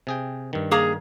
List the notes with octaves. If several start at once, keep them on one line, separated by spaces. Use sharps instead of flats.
C3 G#4 G5
G2 D#3
A#3 G#4 A#5